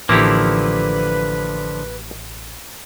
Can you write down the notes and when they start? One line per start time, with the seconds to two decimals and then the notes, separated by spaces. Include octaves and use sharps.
0.09 A1 D3 F3 A#3 E4 G4 B4